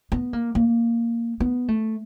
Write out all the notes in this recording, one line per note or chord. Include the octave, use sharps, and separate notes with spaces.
B3
A#3
A#3
B3
A3